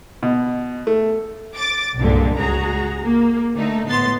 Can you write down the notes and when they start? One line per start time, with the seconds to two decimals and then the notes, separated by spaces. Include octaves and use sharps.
0.23 B2
0.87 A3
1.57 D6 A6
1.98 C2 G2 A#2 D3 G#3
2.36 C#2 F#4 G#4 A#5
3.03 A#3
3.55 D3 A3 D#4
3.88 A2 B3 C6 A6